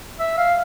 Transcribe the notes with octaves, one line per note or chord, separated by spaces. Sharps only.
E5
F5